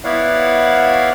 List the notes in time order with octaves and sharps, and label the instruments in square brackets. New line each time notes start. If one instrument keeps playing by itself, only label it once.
[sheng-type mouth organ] B3 E4 C#5 D5 F5 F#5